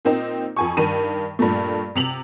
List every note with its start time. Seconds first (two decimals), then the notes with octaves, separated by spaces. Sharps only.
0.05 A#2 A#3 C4 D#4
0.57 F2 G#5 C#6
0.77 G2 D#3 D#7
1.39 G2 A#2 A3
1.95 C3 F7 F#7